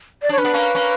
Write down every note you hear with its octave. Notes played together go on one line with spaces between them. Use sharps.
D5
D4
C#5
C#4 B4
B3 D4
A#3 C#4
A#3 C#4